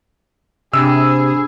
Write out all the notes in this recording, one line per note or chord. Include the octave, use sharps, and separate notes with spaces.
C3 D4 G#4 B5 E6